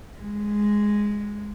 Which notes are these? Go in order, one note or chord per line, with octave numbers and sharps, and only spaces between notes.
G#3